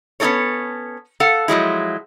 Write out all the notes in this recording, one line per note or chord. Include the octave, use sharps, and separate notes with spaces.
B3 C#4 D#4 F4 A4 C#5
A4 F5 F#5
F3 F#3 G#3 E4